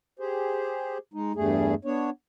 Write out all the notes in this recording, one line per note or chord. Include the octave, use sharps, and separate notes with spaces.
G4 G#4 C5
G#3 D#4
E2 G2 G3 A3 G#4
B3 D4 C#5